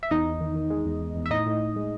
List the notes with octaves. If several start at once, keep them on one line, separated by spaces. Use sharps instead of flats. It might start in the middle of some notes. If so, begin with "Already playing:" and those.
E5
E2 D#4 D#5
E2
D#3
D#3
G#3
E2
E2
E2
E5
A2 D#4 D#5
A2
A2
G#3